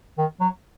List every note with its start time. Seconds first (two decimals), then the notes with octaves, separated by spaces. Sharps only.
0.18 D#3
0.40 F#3